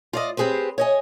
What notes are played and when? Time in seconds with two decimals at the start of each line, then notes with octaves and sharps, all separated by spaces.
0.13 F4 D5 D#5
0.37 C4 G4 G#4 B4 C5
0.78 C#5 D#5 G#5